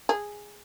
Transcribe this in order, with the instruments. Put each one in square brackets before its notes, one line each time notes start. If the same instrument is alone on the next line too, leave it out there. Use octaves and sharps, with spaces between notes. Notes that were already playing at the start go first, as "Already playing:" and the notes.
[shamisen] G#4